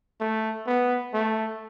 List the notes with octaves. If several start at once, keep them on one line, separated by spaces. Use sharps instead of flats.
A3
B3
A3